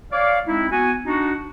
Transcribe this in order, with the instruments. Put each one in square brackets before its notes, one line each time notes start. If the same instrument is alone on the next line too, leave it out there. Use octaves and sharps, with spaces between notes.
[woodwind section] C#5 D5 F5
G#3 C4 D#4 E4
B3 F#4 G#5
D4 D#4 F#4